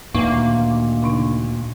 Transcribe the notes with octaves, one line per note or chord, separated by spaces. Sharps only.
D2 A#2 D#3 A#3 D#4 B4
C#3 D4 D#4